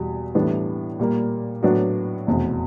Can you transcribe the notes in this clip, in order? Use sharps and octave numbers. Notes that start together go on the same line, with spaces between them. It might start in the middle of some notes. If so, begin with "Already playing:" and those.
Already playing: E2 B2 G3
A2 E3 G3 B3 D4
A#2 G3 A#3
A2 F#3 B3 D4 F#4
F1 E2 B2